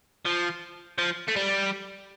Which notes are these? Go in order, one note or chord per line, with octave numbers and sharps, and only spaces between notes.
F3
F3
A3
G3